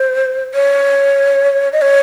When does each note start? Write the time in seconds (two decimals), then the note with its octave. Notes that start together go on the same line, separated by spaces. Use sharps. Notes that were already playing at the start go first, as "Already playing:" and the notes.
Already playing: C5
0.54 C#5
1.73 D#5
1.82 C#5